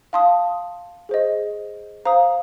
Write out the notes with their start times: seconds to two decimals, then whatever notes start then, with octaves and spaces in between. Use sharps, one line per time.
0.13 F5 A5 C6 D#6
1.09 G#4 C5 D#5
2.05 C5 F5 A#5 D#6